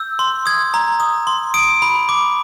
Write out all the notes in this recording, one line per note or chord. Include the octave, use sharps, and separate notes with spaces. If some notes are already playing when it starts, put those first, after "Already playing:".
Already playing: E6 G6
C6
D#6 G#6
A#5
D#6
C6
D#6 D7
B5
D6